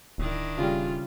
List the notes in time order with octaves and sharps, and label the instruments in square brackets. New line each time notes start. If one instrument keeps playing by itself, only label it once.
[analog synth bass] D1 [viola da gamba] D#3 D4 E4
[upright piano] C#3 G3 [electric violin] F4